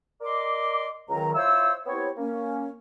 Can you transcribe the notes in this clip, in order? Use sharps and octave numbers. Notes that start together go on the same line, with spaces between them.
A#4 D5 D#5 C6 D6
C#2 D#3 F#3 A#5
E4 F4 C5 C#5 E6
B3 C4 E4 G4 C#5
A#3 C#4